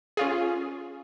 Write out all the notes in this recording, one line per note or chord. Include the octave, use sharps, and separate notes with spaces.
C#4 F4 G#4